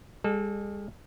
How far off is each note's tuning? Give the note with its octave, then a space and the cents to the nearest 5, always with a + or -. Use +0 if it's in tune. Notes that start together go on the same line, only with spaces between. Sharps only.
G#3 -45 A4 -25